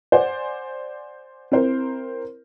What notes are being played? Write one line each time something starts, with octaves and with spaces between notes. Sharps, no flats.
C5 D5 F#5 G#5
C4 E4 A#4 C5